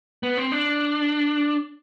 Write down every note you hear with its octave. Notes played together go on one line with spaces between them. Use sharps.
B3
C4
D4